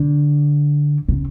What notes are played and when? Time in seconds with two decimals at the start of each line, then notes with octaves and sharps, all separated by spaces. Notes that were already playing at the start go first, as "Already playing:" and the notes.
Already playing: D3
1.08 C#3